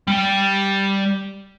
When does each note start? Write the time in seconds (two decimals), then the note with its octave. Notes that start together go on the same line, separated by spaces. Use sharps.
0.08 G3 G5